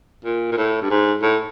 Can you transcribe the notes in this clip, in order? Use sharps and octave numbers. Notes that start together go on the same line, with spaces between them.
A#2
A#2
A2
G2
G#2
A2